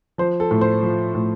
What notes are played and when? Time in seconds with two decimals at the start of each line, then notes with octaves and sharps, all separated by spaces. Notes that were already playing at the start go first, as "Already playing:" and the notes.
0.18 F3 C5
0.40 A4
0.51 A2
0.61 C5
0.83 F3
1.15 A2